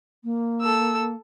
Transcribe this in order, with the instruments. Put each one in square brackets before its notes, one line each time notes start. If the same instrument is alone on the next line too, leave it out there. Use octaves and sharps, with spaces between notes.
[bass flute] A#3
[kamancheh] A4 E6